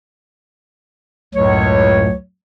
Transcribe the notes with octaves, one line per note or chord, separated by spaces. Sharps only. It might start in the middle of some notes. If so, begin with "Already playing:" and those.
C#2 F#2 A2 C#5